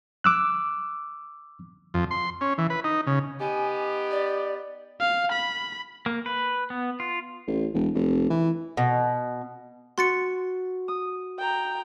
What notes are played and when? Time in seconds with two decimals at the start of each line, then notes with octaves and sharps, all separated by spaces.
0.24 D6 E6 F#6
1.94 F2
2.11 C6
2.41 C#4
2.58 E3
2.70 B4
2.84 D#4
3.07 C#3
3.40 B3 D#4 G4 G#5
4.11 D5
5.00 F5
5.32 B5
6.06 A#3
6.26 B4
6.70 B3
7.00 F4
7.47 A1
7.74 E1
7.95 F1
8.30 E3
8.77 B2
9.98 F#4 C6 A6 C#7
10.88 D#6
11.39 G5 A#5